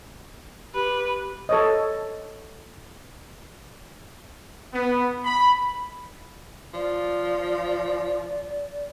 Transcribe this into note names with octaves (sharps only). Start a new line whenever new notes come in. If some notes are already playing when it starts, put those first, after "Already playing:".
G4 B4
A4 C#5 D#5
B3
B5
F3 D5